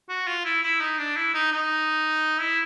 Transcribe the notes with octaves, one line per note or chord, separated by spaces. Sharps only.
F#4
F4
E4
E4
D#4
D4
E4
D#4
D#4
E4